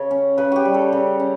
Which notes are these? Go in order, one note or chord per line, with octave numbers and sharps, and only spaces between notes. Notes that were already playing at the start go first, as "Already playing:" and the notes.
Already playing: C#3 C#5
C#4
C#3 B4
F#4 G4
G3
A4
C#3
C#4